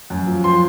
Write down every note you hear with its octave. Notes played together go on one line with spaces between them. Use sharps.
F#2
F3
F3 C6